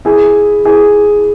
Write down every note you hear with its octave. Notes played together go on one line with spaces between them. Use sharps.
E4 G#4
E4 G#4